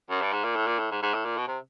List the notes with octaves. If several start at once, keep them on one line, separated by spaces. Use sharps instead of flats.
F#2
G2
G#2
A#2
A2
A#2
A2
G#2
G#2
A2
A#2
B2
C3